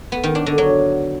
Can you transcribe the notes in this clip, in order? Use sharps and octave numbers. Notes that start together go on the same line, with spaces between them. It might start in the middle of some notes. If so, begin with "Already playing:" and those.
B3
D#3
D4
D3
F#3